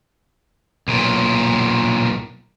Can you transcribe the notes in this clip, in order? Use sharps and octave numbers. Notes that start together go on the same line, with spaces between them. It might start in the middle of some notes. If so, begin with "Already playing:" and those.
B1 A#2